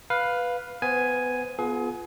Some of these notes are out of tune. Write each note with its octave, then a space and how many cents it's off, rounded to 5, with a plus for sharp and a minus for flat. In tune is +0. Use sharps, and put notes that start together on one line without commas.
B4 +0 F5 +10
B3 +20 C5 +0 G#5 +0
B3 +0 F4 +0 G#4 +30